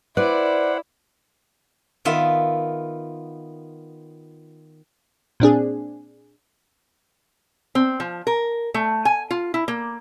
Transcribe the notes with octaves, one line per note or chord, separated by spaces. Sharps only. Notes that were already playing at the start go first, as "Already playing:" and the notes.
E4 B4 C5 D5 F#5
D#3 B3 F4 E5
A#2 C4 D4 G#4
C4
F3
A#4
A3
G#5
F4
E4
A#3